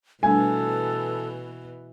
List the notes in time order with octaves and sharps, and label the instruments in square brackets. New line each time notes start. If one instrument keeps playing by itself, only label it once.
[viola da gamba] B2 E3 [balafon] G3 A3 D4 [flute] A4 [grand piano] G#5